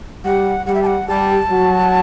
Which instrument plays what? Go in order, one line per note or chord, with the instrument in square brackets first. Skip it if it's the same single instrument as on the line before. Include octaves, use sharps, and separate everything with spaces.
[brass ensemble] G3 G4 [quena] F#5
[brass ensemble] G3 G4 [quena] F#5
[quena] E5
A5
F#5
[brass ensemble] G3 G4 [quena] A5
[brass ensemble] F#3 F#4